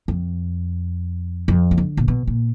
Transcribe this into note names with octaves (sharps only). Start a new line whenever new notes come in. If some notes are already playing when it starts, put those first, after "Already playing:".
F2
F2
D#3
D3
A#2
B2
A#2